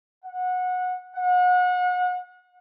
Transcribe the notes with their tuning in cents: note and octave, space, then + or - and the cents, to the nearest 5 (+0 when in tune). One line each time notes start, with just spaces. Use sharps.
F#5 -20
F#5 -35